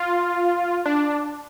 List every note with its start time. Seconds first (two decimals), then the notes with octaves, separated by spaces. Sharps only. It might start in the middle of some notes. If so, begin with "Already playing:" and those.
Already playing: F4
0.86 D4